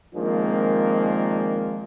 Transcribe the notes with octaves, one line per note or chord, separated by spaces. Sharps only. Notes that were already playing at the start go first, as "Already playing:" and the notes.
D#3 F3 G#3 A#3 C4 D4